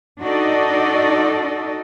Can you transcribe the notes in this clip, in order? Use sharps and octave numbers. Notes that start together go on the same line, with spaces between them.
D4 D#4 F#4 A4 D5 D#5